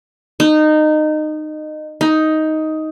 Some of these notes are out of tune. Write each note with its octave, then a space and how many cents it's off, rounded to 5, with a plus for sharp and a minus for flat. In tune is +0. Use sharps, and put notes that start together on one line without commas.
D#4 -20
D#4 +10